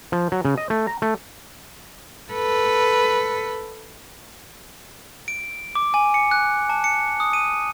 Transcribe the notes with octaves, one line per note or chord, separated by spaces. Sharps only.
F3
F#3
C#3
D#5
A3
A#5
A3
A4 B4
D7
D6
G#5
C#7
F#6
A5
C#7
D#6
D#7